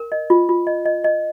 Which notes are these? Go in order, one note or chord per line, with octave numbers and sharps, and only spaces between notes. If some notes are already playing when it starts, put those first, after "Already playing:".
Already playing: A#4
D#5
F4
F4
D#5
D#5
D#5